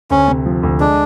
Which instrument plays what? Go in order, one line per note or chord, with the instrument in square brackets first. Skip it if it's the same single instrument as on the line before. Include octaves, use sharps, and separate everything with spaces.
[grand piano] D2 [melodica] C#4
[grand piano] C3
F3
D2
[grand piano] G#3 [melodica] D4